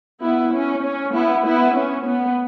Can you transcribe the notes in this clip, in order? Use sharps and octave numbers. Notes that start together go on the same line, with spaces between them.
B3 E4
C#4
C#4
B3 E4
B3 E4
C#4
B3